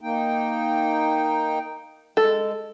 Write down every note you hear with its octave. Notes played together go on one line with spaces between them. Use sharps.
A#3 D#4 G5
G#3 A4